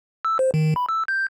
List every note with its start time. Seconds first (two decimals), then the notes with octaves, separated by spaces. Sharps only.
0.25 E6
0.39 C5
0.54 D#3
0.76 B5
0.89 E6
1.08 G6